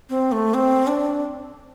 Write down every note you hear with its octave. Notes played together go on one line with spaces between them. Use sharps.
C4
A3
C4
D4